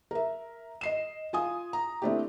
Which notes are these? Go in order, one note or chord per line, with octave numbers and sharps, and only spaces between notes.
A#4 E5
D#5 C7 E7
F4 G#5 D#6
A#5
A3 C4 D4 E4 G4